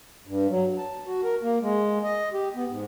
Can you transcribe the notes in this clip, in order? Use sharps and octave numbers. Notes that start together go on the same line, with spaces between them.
G2
F#3
A5
F#4
A#4
A#3
G#3
D#5
G4
B3
G#2